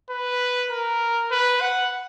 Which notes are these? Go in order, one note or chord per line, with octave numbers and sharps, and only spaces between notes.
B4
A#4
B4
F#5